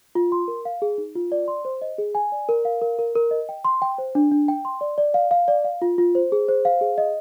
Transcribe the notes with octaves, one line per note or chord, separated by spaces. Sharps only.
F4
C6
A#4
F5
G#4
D#4
F4
D5
C6
C5
D#5
G#4
G#5
D5
A#4
F5
A#4
A#4
A#4
D#5
G5
C6
G5
C5
D4
D4
G5
C6
D5
D5
F5
F5
D5
F5
F4
F4
C5
G#4
C5
F5
G#4
D#5